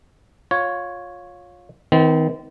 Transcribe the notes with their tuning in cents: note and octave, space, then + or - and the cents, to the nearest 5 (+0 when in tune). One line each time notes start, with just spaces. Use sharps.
F4 +25 C#5 +0
D#3 +30 C4 -35